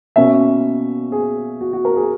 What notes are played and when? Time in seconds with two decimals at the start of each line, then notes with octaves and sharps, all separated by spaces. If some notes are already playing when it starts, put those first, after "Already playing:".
0.16 B2 A#3 C#4 E5
1.12 G#4
1.61 F#4
1.73 F#4
1.85 A#4
1.97 G#4